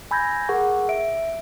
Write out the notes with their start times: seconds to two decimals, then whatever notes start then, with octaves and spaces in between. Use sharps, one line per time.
0.11 G#5 B5 E6 G6 G#6 A#6
0.49 G#4 A#4 F#5 C#6
0.89 E5 D7